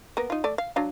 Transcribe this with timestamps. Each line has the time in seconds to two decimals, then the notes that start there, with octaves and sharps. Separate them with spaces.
0.17 A#3 B3 A#4
0.30 D#4 F4
0.44 A3 D5
0.58 F5
0.76 F#3 D4 F5